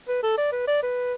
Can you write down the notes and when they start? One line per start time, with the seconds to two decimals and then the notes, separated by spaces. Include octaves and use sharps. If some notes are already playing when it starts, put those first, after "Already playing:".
0.08 B4
0.23 A4
0.38 D5
0.52 B4
0.67 D5
0.83 B4